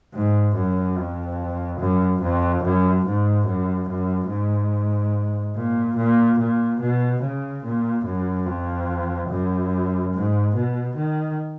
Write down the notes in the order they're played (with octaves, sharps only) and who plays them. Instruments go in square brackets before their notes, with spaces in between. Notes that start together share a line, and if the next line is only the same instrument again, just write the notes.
[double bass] G#2
F#2
F2
F#2
F2
F#2
G#2
F#2
F#2
G#2
A#2
A#2
A#2
B2
C#3
A#2
F#2
F2
F#2
G#2
B2
D#3